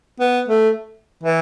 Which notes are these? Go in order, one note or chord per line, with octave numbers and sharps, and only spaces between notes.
B3
A3
E3